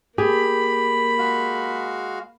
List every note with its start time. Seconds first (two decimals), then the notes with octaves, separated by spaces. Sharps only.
0.18 A#3 G4 G#4 B5
1.18 G#3 F#4 F5